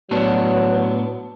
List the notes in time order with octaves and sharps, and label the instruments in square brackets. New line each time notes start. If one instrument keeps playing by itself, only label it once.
[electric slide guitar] A2 B3 D4 [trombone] F#3